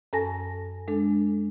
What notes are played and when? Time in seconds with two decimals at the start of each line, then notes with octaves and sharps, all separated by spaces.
0.13 F#2 C#4 A4 G#5 A5 A#6
0.88 G#3 D4 A4